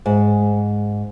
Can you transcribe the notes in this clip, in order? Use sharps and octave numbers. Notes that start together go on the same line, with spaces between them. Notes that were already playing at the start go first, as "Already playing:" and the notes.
G#2